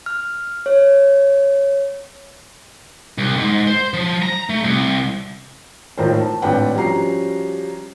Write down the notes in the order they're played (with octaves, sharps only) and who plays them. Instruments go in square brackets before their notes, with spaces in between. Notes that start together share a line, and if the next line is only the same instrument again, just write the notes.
[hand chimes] F6
C#5
[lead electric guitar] C2
G#2
C5
F3
A#5
A3
C2
[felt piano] E1 A2 D#3 F4 A#4 C5
A5
G#1 A2 D4 B4 F#5 G5
F3 G3 C#4 F#4 A#5 C7